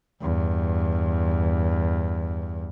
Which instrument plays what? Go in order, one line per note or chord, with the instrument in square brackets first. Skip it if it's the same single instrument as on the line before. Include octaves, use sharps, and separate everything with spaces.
[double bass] E2 G2